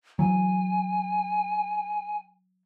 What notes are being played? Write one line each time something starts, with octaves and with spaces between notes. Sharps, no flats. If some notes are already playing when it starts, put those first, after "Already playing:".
E3 F#3 G#5